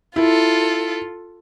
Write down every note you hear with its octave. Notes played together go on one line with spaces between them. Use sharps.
E4 F4 A4